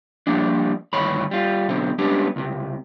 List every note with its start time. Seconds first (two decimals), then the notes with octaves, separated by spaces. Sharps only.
0.27 F3 G3 A#3 D4
0.93 D2 G2 D#3 C#5 B5
1.31 G3 F4
1.69 B1 B2 D3 C4
1.99 G3 G#3 B3 C#4 D4 G4
2.36 C#2 C3